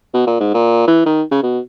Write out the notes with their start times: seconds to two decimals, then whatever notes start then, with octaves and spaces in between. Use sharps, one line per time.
0.14 B2
0.27 A#2
0.40 G#2
0.54 A#2
0.88 E3
1.06 D#3
1.31 C#3
1.43 B2